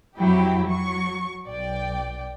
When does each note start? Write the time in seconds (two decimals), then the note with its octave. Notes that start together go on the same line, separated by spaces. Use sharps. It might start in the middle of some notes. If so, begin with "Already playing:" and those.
0.16 F2 F#3 E4 G4 G5
0.67 F#3 C#6
1.47 B1 D5 G5